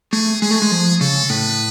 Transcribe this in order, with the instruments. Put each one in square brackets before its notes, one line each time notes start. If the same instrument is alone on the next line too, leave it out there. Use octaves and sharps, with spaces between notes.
[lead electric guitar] A3 [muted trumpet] G#4
[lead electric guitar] G#3 [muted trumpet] G#4
[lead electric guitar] A3
G#3
F3
[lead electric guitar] C#3 [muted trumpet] A4
[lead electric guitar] A2 [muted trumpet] B4